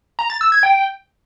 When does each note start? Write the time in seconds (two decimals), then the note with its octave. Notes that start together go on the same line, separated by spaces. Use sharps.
0.19 A#5
0.30 A6
0.41 E6
0.52 G#6
0.63 G5